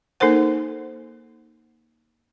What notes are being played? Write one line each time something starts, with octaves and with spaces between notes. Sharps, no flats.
A#3 D#4 A4 A#4 C5 F#5